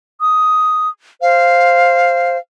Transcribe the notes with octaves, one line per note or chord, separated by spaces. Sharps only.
D#6
C5 F5